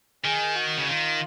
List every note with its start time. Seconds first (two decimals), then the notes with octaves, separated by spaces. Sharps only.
0.24 D#3 G#4
0.56 F#4
0.78 C#3
0.88 D#3 F4